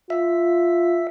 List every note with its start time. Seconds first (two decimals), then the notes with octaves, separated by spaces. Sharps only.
0.10 F4 E5